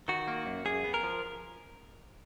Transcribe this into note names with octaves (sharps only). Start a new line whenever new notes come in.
D#3 F#4
A#3
F#2
F#2 G#4
B3
A#4
F3